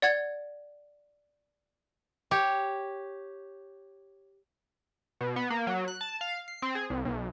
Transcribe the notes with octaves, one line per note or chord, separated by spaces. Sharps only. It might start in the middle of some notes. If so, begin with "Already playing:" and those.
D5 F#5 G#6
G4 C#5
B2
B3
A#3
F#3
F#6
A5
F5
C7
C4
G#4
C2
B1